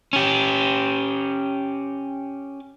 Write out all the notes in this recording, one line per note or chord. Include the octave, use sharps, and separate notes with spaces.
C#4 G4